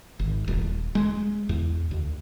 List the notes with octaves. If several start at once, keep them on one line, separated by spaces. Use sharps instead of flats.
G#1
D#1
G#3
E2
D2